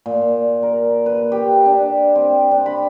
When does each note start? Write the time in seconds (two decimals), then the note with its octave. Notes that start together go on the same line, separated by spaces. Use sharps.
0.06 A#2
0.63 A#4
1.06 B4
1.32 G4
1.66 D4
2.16 C4
2.51 D4
2.66 B5